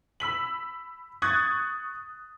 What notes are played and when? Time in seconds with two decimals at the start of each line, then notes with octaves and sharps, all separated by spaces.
0.20 B5 E6 B6 F#7
1.22 C#6 D#6 F#6 G#6 A6